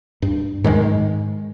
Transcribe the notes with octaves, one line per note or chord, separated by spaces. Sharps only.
G2
G#2 D#3 G#3